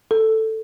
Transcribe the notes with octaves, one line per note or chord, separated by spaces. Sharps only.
A4